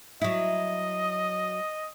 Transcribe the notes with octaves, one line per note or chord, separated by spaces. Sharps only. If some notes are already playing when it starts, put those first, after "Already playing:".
F#3 E4 D#5